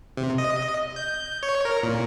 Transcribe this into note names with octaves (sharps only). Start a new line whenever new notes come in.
C3
D#5
G6
C#5
A#4
A#2